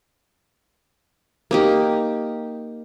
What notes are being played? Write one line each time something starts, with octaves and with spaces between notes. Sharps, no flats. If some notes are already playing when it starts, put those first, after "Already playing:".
A#3 D#4 G4